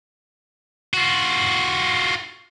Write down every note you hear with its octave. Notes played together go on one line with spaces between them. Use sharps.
F4 F#4